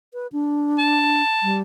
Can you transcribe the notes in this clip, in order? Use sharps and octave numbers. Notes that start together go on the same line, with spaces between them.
B4
D4
A5
G3